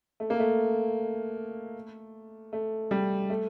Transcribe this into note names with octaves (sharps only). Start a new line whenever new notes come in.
A3
A#3
A3
A3
G3
A3